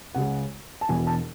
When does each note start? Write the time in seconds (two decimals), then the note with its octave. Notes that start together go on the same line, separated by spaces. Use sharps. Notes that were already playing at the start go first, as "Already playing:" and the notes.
0.15 C#2 C#3 G#3 F#5
0.81 A5
0.89 E1 E2 B2 G#5
1.07 A5